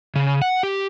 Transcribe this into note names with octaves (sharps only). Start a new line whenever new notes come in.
C#3
F#5
G4